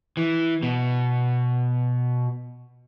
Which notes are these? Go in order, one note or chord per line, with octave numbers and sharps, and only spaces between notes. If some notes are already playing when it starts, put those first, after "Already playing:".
E3
B2